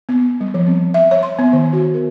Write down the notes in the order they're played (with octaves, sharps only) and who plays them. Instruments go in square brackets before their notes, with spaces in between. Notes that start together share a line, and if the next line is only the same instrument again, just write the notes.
[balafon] B3
G3
F3
C4
E5
C#5
C6
B3
D#3
F#4
A#4